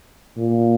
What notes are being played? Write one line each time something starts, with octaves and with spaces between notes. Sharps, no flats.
A#2